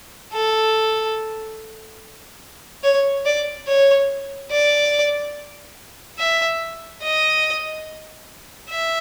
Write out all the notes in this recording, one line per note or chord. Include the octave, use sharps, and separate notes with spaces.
A4
C#5
D5
C#5
D5
E5
D#5
E5